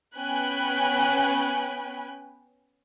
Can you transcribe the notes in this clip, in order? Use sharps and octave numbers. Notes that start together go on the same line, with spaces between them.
B3 C#4 G5 G#5 B5 F#6